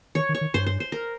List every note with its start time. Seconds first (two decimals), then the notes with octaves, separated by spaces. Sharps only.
0.15 D#3 C#5
0.29 D#3
0.35 C#5
0.41 D#3
0.54 G2 C5
0.66 C5
0.80 C5
0.92 A#4